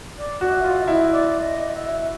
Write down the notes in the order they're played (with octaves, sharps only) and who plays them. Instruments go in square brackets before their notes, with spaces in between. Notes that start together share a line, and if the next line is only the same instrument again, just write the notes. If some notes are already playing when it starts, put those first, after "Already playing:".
[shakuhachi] D5
[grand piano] F#4
[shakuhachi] E5
[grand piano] F4
[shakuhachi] D#5
[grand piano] E4
[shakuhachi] D5
D#5
E5